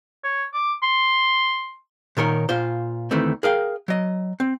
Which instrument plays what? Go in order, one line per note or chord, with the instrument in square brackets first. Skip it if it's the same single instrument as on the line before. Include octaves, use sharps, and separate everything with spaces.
[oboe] C#5
D6
C6
[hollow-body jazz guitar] A#2 D#3 A#4 C#5
A#2 F4 C5
D2 D#3 E3 A3 C4
G#4 A#4 F5 G5
F#3 D#5
C4